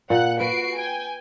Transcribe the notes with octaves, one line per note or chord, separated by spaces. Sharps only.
A#2 F#5 F#6
F#4 B4 C7 D7
G5 G#5